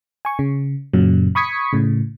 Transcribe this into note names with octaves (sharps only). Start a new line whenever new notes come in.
G#5 C#6
C#3
F#2 A#2 C#3 F#3
B5 C#6 D#6 G#6 B6 C#7
A2 C#3